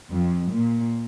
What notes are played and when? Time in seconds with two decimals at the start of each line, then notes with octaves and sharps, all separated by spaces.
0.12 F2
0.52 A#2